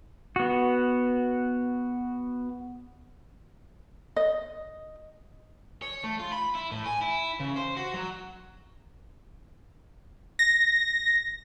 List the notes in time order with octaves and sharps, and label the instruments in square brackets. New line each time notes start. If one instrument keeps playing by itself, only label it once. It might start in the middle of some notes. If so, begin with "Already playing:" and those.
[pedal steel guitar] B3 F#4
[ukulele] D#5
[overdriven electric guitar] C#5
A3
F4
B5
E4
A2
G#5
E4
C#3
C5
F#4
F#3
[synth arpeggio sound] A#6